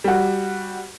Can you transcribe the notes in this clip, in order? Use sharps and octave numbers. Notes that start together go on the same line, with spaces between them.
G3 F#4